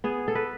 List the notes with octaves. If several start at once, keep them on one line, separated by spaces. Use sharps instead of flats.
B3 G#4
A4
B4